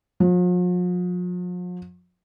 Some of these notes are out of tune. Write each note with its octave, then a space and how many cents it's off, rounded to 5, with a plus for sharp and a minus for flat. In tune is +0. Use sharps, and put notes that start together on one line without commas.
F3 +45